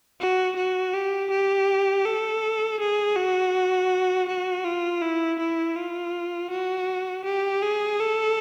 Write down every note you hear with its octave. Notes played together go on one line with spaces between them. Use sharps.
F#4
F#4
G4
G4
A4
G#4
F#4
F#4
F4
E4
E4
F4
F#4
G4
G#4
A4